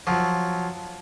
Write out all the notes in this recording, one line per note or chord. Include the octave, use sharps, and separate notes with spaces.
F3 F#3